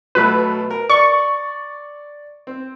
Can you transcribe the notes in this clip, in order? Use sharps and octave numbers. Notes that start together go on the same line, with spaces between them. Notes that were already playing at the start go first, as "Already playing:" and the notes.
B2 F#3 A3 B4
A#4
D5 C#6
C4